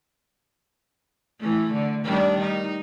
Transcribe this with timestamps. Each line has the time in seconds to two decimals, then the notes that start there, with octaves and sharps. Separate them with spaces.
1.39 E3 A3
1.73 D3
2.04 D#3 G3 D4
2.41 D#4